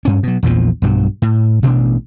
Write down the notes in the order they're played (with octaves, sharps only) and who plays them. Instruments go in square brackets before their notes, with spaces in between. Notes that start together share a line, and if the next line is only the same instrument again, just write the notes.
[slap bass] G2 C#4
B2 F#3
A#1 E2 A#2 F3
B1 G2 F#3
A2
A1 B2 D4